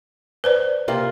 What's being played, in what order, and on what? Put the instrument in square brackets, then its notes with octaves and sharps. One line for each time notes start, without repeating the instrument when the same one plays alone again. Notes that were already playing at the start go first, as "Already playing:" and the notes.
[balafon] B4 C5 D5
[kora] C3 A#3 F4